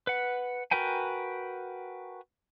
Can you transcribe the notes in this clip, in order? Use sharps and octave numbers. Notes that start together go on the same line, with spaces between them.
B4 F#5
F#4 A#4 B4 G5 G#5